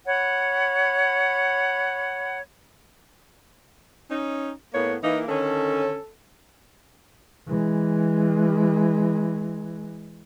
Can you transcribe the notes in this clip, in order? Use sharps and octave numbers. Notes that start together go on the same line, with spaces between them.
C#5 F#5 B5
C#4 D#4
A2 A#3 B3 C#5
E3 A#3 D#4
D3 D#3 C#4 A4
E3 G#3